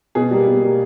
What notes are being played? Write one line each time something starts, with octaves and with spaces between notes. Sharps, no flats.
B2 G#4
G3 A#3
B2
G3 A#3